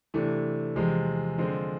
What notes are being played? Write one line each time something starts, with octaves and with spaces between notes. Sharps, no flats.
C3 E3 A3 D4
E2 C3 F3 G#3
D3 F3 G#3 C4